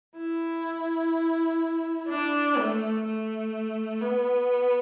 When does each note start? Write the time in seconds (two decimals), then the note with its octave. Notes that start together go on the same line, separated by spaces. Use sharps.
0.17 E4
2.09 D4
2.57 A3
3.05 A3
4.01 B3